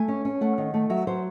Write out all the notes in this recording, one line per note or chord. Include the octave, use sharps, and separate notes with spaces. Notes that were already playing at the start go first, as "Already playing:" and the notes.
Already playing: A3 G#5
C#4
C#4
A3 F#5
D#3
A3
F#3 E5
F#3 C5